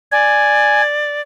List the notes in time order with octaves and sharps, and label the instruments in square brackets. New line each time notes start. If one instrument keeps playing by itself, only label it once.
[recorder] D5 [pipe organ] G#5